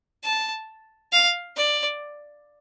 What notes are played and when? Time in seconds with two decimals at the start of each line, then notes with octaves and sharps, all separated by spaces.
0.24 A5
1.12 F5
1.57 D5